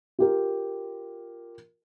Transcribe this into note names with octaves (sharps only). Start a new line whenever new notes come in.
F4 G4 A#4